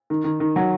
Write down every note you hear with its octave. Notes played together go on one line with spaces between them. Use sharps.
D#3
D#3
D#3
F#3